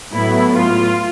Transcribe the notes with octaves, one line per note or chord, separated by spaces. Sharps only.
A2 F#3 B3 E4
F4